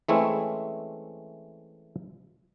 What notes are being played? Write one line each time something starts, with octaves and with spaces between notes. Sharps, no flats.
E3 G#3 A3 C4 C#4 E4